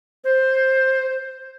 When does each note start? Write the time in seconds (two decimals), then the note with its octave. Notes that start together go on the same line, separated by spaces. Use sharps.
0.24 C5